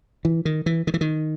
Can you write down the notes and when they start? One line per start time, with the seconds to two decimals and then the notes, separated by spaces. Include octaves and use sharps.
0.25 E3
0.45 D#3
0.66 E3
0.87 D#3
0.94 E3
1.01 D#3